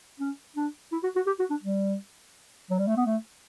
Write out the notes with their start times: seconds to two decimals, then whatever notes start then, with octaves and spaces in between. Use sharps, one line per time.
0.20 C#4
0.57 D4
0.92 E4
1.03 F#4
1.16 F#4
1.27 G4
1.39 F#4
1.50 D4
1.63 G3
2.70 F#3
2.79 G3
2.87 A3
2.97 B3
3.06 A3